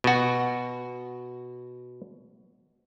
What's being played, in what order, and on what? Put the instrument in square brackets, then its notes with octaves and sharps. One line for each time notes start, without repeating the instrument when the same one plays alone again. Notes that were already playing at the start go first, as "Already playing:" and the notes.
[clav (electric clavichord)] B2 F#4